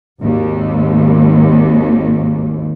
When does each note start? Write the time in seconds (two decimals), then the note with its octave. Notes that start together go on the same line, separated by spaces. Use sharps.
0.20 G#1 D#2